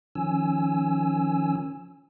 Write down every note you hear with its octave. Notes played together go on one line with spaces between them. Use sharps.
D#3 F3 C#4 G#5 E6